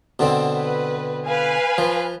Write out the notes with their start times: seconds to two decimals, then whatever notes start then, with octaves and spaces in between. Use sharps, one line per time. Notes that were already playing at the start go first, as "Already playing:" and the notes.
0.19 B2 D3 C4
0.56 B4
1.26 B4 F5 G#5
1.78 F3